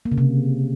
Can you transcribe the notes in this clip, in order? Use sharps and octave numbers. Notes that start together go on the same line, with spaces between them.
A#3
C#3
C3